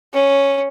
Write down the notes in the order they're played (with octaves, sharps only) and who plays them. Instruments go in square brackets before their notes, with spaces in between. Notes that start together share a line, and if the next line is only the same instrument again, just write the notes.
[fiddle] C#4